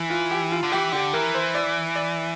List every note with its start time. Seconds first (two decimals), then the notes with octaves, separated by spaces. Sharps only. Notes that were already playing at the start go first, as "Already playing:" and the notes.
Already playing: E3
0.10 F4
0.31 G4
0.52 F4
0.63 D3
0.72 E3 G4
0.92 D3 G4
1.13 E3 A#4
1.34 C5
1.55 D5
1.96 D5